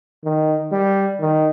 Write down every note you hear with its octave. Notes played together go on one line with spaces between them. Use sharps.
D#3
G3
D#3